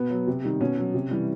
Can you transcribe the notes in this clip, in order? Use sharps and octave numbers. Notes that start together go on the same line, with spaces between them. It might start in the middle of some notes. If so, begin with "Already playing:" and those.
Already playing: B2 B3
F#3
C3
D#3 G3
B2 C#4
F#3
C3
E3 G3